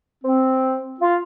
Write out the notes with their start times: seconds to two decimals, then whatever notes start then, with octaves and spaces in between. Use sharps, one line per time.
0.24 C4
1.01 F4